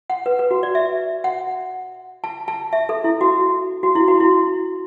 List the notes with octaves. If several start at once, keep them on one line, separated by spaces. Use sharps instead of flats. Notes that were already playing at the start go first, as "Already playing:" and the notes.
F#5
B4
B4
F#4
D5
E5
F#5
A5
A5
E5
A4
E4
F#4
F#4
E4
F#4
E4